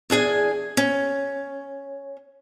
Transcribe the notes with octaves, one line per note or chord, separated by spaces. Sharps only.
E2 D4 G#4 G#5
C#4